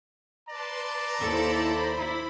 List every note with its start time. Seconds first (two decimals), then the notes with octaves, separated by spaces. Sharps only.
0.49 B4 D5 A5 A#5 C6
1.20 D#2 E4 A4 C5 B5
1.96 E4 B5